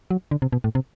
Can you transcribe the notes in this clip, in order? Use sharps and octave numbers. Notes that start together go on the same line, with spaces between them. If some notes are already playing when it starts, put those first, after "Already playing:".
F#3
D3
C3
B2
A2
C3